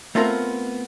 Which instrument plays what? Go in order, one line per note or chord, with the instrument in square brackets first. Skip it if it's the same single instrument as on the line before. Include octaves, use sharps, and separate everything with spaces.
[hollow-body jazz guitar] A3 B3 C4 F4 G4 A#4